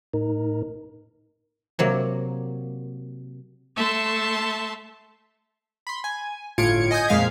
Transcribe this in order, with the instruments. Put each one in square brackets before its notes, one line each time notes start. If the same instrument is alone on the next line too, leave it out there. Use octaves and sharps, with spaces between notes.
[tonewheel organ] A2 D#4 A#4
[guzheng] C3 F#3 A#3
[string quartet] A3 E5 A5 C6
[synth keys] B5 C6
G#5
G1 A2 F4 G#6 C#7 D7
D#5 G#5 D#6 G6 G#6
F2 A#2 G#3 F5 G#6 B6